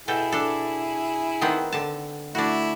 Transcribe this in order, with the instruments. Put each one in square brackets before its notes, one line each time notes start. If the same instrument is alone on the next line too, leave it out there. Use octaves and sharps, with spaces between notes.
[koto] B2 A4 G5 [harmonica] E4 G#4
[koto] D4 A4
D#3 B3 C4
D3 A5
[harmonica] A3 E4 [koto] D4 F#4